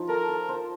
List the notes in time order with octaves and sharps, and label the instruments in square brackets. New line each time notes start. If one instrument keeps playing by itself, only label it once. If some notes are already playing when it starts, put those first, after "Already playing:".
Already playing: [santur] F3 D#4 F4
[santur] A4 [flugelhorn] A#4
[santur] A4
C5